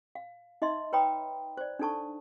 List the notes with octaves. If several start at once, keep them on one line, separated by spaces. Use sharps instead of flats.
F5
D#4 D#5 E5 C6
B4 C#5 G5 A#5 B5 D#6
C5 D5
D4 D#4 A4 A5 C#6